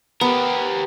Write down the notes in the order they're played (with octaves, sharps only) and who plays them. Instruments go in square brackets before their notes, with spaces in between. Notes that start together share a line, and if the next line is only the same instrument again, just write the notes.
[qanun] B3 [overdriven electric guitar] G4 A#4